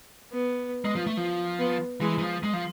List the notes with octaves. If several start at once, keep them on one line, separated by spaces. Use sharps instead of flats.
B3
G#3
F3
A3
F3
B3
E3 G#3
E3
F3
G#3
F3